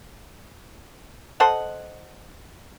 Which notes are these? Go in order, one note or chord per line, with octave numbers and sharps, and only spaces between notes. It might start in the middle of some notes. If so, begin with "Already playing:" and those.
A4 C5 D#5 F#5